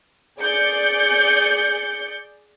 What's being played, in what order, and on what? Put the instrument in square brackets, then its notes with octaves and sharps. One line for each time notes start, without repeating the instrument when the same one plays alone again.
[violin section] G#4 D5 G6 C#7